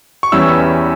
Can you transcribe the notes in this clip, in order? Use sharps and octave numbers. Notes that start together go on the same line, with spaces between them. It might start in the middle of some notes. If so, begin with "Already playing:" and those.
C#6
E2 E3 G3 C#4 E4 E6